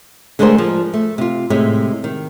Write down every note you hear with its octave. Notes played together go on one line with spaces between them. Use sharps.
D3 G#3 A3 G#4 A#4 C5
F3
A3
C3 F4
A2 C3 G#3
D#3